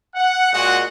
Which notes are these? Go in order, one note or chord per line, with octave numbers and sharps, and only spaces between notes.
F#5
A#2 G#3 F#4 F#5